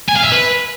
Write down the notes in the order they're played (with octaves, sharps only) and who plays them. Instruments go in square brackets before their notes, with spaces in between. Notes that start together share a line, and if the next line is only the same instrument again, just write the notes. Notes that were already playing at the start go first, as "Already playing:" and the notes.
[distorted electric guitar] G#5
F5
E5
B4